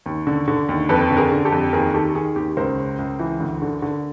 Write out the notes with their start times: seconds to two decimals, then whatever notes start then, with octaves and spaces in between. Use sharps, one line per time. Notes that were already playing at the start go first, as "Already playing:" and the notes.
0.06 D#2
0.27 D3
0.48 D3
0.69 D#2
0.89 F2 A4 B4
1.11 D3
1.17 G#4 A#4
1.32 D3
1.45 G4 A4
1.52 F2
1.73 D#2 G#4 A#4
1.94 D#3 G4 A4
2.15 D#3 G#4
2.36 D#2 G4
2.57 C#2 A#4 C5
2.77 C#3
2.99 C#2
3.19 E3
3.40 D2
3.62 D3
3.82 D3